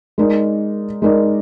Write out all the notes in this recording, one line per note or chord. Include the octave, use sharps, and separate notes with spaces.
G#3 D#4 A#4 D5
G#3 D#4 A#4 D5